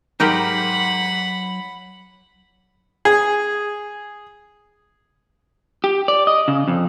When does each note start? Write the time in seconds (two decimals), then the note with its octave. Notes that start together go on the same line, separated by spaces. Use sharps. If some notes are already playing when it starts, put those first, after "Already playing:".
0.20 G#2 F#3 D#4 G4 A#4 F#5 B5
3.05 G#4
5.84 G4
6.08 D5
6.27 D#5
6.48 C#3
6.68 F2